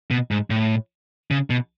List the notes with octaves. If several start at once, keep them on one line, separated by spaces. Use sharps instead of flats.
B2
G#2
A2
C#3
B2